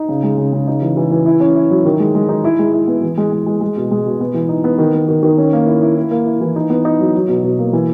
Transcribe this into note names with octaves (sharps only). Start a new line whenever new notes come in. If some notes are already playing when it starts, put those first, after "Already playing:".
Already playing: D#4
C#3
G#3
C#3
C#3
D#4
E3
E3
E3
E4
C#4
E4
F#3
D#3
G#3
G#3
D#4
E4
G#3
E4
B3
E3
G#3
G#3
G#3
G#3
B2
G#3
B2
B3
E3
D#4
B3
D#3
B3
D#3
D#3
C#4
A#3
E4
E4
E4
A#3
E4
E3
D#4
B3
D#4
F#3
F#3
B2
B2
A#3
E3